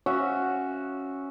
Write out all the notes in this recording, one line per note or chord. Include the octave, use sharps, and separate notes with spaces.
C#4 F#4 E5 F5